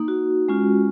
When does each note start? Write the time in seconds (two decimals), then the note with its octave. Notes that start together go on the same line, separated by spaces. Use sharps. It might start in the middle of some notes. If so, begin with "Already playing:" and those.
Already playing: A#3 D#4
0.08 F#4
0.48 G#3 C#4 F4